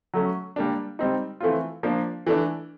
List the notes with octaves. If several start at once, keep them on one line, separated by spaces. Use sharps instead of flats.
F#3 A3 C#4
G3 A#3 D4
G3 C4 D#4
E3 A3 C4 F4
F3 A#3 D4
E3 A3 D4